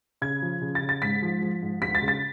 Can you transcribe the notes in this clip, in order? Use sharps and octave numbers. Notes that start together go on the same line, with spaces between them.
C#3 G#6
F3
C#3
A6
C#3
A6
G#2 B6
F3
F3
G#2
D2 B6
A6
C#3
A6